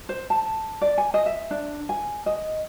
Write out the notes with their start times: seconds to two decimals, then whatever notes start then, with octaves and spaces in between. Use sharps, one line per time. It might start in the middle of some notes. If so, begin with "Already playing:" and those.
0.09 C5
0.30 A5
0.82 D5
0.98 G#5
1.14 D#5
1.26 E5
1.51 D4
1.89 G#5
2.26 D#5